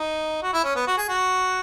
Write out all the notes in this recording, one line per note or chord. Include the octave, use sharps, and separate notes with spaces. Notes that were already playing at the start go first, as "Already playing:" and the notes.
Already playing: D#4
F#4
E4
C#4
B3
F#4
G#4
F#4